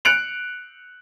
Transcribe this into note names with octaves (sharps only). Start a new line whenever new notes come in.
F#6 C#7 D7 F7 F#7